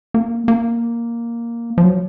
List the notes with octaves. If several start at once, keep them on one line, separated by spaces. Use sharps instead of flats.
A#3
A#3
F3
F#3